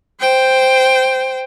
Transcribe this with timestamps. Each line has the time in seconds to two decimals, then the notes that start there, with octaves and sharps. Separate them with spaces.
0.20 C5 G5